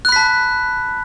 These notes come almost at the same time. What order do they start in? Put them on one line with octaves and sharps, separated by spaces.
F#6 B5 B6 A5